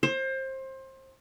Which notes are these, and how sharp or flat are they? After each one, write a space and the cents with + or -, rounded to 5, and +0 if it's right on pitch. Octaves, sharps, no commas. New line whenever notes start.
C5 +25